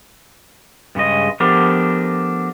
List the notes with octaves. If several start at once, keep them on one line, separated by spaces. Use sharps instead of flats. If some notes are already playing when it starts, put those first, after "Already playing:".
G2 C#3 G#3 D#5
F3 A3 B3 D4 G4 A#4